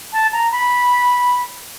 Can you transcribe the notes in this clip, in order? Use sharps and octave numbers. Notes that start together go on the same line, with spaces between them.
A5
A#5
B5